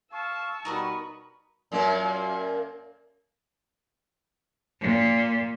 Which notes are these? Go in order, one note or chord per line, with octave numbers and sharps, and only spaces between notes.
F5 A5 C#6 E6
B2 G3 D#4 A#4 B4
F#2 A#2 A#3
A#2